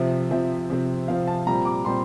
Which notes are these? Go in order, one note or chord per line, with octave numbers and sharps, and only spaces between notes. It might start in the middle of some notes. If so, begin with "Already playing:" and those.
Already playing: C3 F3 C4 E5
C3 F3 C4 E5
C3 F3 C4
C3 F3 C4 F5
A5
A#2 G3 C4 A#5
D6
A#2 G3 C4 C6